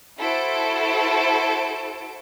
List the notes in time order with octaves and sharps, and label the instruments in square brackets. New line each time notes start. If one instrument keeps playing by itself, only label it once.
[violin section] E4 F#4 A4 C5 A5 D7